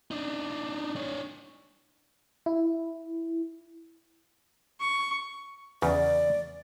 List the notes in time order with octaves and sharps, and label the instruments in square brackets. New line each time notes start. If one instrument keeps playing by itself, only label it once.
[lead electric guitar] D4 D#4
D4 C#5
[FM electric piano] E4
[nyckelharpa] C#6
[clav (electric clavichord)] E2 C#3 [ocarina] D5